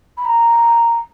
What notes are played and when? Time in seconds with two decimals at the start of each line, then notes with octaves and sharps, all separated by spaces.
0.17 B5
0.25 A#5